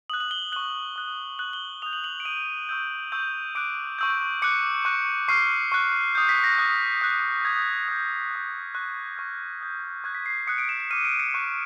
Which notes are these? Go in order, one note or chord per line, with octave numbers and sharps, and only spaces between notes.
D#6 F#6 F#7
F#7
G7
C#6 F#6 F#7
D#6 F#6
D#6 F#6 F#7
G7
D#6 G6 F7
F#7
F#7
D7
D#6 G6 D#7
C#6 E6 G6
C#6 E6 G6
D6 F#6 D7
C#6 E6 G6
D6 F#6 C#7
C#6 F#6
C#6 F6 C7
C#6 F#6
D#6 G6
B6
A#6
D#6 F#6
D#6 F#6
D#6 G6 G#6
D#6 G6
D#6 G6
C#6 F#6
C#6 F6
D#6 G6
C#6 F#6 G#6
B6
C7
D#6 F#6 C#7
D7
E7
E7
D6 F6 D#7
D7
C#7
C#6 F#6